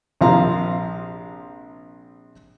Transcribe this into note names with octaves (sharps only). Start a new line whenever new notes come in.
A#1 C3 F3 F5 A#5 C6